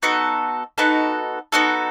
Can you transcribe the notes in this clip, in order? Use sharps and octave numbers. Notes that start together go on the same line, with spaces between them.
B3 D#4 F#4 A4
B3 D#4 F#4 A4
B3 D#4 F#4 A4